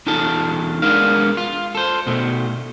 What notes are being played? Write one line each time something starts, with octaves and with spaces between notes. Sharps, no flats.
E2 D#4 F4 A4 A5
G#3 B3 D4 A#4 F5
F4
A4 C5
B2 A3